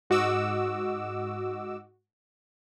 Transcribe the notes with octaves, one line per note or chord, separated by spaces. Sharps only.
G#2 F#4 D#5 D6 E6